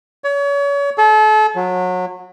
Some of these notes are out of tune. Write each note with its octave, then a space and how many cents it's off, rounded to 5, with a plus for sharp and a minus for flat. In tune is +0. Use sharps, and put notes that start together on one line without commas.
C#5 +35
A4 -35
F#3 -25